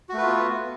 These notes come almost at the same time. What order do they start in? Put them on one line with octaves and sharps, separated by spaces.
F#4 A3 B4 F4 B3